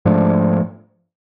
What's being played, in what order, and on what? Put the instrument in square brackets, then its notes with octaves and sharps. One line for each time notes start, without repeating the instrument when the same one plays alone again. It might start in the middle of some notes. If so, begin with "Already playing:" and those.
[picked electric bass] G#2 F3 A3 D4